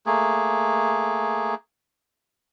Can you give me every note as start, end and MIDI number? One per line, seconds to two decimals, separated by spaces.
0.06 1.55 57
0.06 1.55 58
0.06 1.55 68